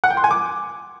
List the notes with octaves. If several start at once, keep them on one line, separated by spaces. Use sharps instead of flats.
F#5
G5
C6
G#5
D6